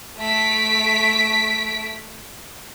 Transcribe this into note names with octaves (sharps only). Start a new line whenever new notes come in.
A3 B6 D7